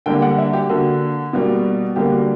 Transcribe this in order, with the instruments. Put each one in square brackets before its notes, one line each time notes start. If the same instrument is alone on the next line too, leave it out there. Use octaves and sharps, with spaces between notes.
[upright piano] D3 G3 A#3 G5
F#5
E5
G4
D3 A#3 F#4
B2 G3 A#3
D3 G3 A#3 G4
F#4